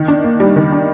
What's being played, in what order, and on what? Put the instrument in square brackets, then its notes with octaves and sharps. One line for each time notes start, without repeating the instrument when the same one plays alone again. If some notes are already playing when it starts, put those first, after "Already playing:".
Already playing: [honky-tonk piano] D#3
D4
A#3
G3
D#3
D4